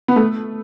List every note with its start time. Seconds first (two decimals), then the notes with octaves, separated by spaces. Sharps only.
0.08 B3
0.16 A3